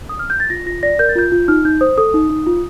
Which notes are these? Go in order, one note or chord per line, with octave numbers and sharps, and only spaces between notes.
D#6
F6
G6
A6
F4 A#6
F4 A#6
D5 A#6
A#4 G6
A6
F4 G6
F4
D#4 F6
D#4 G6
C5 D#6
A4 D#6
D#4
D#4
F4